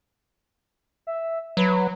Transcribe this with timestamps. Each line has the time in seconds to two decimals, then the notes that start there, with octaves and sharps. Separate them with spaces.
1.07 E5
1.57 F#3 B4